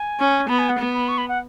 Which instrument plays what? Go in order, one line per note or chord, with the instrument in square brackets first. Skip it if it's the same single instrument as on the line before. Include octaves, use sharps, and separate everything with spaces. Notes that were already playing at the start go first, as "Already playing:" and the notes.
Already playing: [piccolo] G#5
[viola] C#4
[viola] B3 [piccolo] B5
[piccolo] G#5
F#5
[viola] B3
[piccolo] B5
C#6
B5
F#5